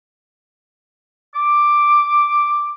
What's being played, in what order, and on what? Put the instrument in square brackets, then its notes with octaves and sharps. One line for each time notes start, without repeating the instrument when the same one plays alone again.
[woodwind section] D6